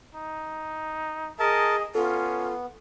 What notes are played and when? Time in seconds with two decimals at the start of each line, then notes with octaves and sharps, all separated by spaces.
0.15 D#4
1.39 G#4 A#4 D#5 A5
1.95 B3 C#4 F4 A4